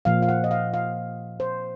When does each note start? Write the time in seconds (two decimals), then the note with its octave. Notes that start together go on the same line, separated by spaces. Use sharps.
0.05 A#2 F3 A#3 F5
0.22 F5
0.28 F#5
0.44 D#5
0.51 F5
0.74 F5
1.40 C5